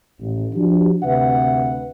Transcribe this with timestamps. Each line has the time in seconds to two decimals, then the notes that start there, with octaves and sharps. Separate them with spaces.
0.20 A1
0.55 F3 D4 F#4 G4
1.03 D2 C3 B4 E5 F#5